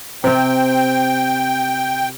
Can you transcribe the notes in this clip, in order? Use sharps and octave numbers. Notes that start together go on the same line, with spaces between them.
C3 C4 G5